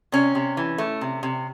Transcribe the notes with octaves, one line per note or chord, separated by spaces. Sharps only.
C3 C#4
C3
E3
A3
C3
C3